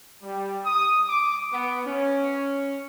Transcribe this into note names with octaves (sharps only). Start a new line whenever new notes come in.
G3
D#6
D6
B3
C#4